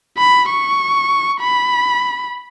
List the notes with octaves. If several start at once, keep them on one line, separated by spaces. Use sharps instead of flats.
B5
C#6
B5